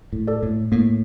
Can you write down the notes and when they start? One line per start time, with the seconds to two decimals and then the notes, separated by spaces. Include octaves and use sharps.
0.13 A2
0.27 A4 D5
0.43 A2
0.72 A2 A#3